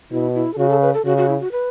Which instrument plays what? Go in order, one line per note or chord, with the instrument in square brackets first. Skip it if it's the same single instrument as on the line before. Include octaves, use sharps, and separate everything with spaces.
[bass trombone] B2 [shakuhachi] E4
[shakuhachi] E4
A4
[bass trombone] C#3 [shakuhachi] F#4
[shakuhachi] A4
B4
A4
[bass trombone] C#3 [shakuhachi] F#4
[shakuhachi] F#4
E4
F#4
B4